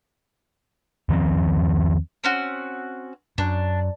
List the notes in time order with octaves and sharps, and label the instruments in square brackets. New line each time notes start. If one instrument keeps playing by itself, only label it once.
[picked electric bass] E2 D#3 F3 C4
[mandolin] C4 C#4 F#4
[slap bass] F#2 [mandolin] D4